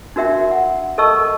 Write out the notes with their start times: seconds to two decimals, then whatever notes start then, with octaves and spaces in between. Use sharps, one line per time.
0.16 D4 F#4 A#4 E5 G5
0.51 F#5
0.98 A4 A#4 D#5 A5 C#6 E6